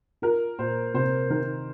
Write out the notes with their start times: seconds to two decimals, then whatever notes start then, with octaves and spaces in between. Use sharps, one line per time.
0.22 F4 A#4
0.59 A#2 C5
0.94 C3 C5
1.30 D#3 A#4